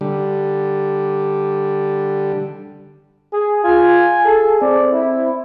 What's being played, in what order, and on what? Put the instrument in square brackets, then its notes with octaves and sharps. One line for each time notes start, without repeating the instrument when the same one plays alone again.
[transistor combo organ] D3 G3
[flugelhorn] G#4
[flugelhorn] F4 [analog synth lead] G#5
[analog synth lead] G#4 [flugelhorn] A4
[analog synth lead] C4 [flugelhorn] D5
[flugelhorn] E4